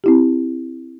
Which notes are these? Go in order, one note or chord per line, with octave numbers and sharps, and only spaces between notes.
C4 E4 G4